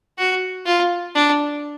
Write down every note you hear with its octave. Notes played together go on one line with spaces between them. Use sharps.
F#4
F4
D4